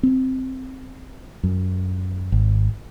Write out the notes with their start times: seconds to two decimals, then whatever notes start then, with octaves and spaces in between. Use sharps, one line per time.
0.03 C4
1.43 F#2
2.32 G#1